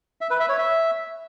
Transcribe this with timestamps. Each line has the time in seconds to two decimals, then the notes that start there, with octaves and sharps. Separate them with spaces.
0.21 E5
0.30 B4
0.40 E5
0.49 C#5
0.58 E5